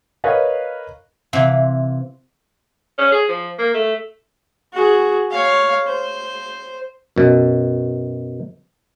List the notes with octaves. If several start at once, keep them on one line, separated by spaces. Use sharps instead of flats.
A#4 B4 C#5 D#5 F5
C3 E3 F4
C#4
G#4
F3
A#3
A3
F#4 G#4
C#5 F5
C5
F#2 B2